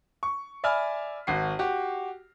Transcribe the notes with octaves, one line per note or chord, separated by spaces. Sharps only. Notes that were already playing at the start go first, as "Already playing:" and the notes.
C#6
D5 E5 G#5 B5 F6
G#1 F#4 C7
F#4 G4